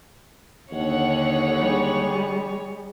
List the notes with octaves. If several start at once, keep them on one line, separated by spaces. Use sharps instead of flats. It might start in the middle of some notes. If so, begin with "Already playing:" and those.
D#2 D3 C#5 F#5
G3 G#3